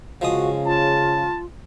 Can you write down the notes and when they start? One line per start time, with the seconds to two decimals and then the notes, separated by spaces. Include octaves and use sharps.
0.21 C#3 F3 G#3 F#4 D#6
0.66 F4 A5